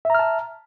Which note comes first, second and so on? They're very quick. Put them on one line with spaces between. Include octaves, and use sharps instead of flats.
E5 A#5 F6 A5